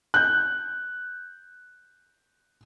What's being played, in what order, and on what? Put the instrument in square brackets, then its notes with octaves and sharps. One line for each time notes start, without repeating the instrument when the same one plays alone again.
[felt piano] F#6 G6